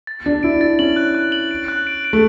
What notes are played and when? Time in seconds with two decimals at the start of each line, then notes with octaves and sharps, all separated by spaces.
0.07 A6
0.26 D4 A6
0.43 E4 D7
0.61 D4 A6
0.79 C#4 F#7
0.96 F#6
1.15 F#6
1.32 F#7
1.51 D7
1.68 F#6
1.87 D7
2.04 D7
2.13 A3